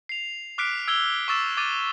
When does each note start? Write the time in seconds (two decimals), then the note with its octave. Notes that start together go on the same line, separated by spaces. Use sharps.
0.09 C7 F7
0.58 D6 F6 F#6 B6 C7 D7
0.88 E6 G#6 D7 G7
1.28 C#6 D6 E6 A6 E7
1.57 D6 G#6 A6 D#7